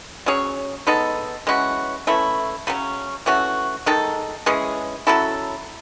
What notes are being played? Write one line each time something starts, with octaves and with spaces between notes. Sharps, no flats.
F#3 C#4 G#4 C#5
G#3 B3 D#4 A4
E3 G#3 C#4 F#4
E3 A3 C#4 E4
C#3 F#3 C#4
E3 A3 C#4 F#4
D#3 G#3 D#4 A4
E3 G#3 C#4 G#4
F#3 C#4 E4 A4